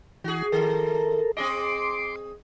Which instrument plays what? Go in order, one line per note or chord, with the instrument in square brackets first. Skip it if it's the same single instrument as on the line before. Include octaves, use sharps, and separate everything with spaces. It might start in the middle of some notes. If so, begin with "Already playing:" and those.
[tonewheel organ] E3 [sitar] F#4 G#4
[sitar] D#3 [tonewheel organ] A4 A#4
[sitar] C4 G#4 D#5 [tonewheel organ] C6 D6